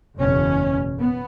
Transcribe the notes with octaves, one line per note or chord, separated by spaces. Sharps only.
F#1 E2 B2 C#4
B3